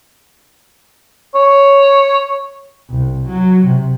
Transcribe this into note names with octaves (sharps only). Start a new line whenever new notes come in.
C#5
C2
F#3
C3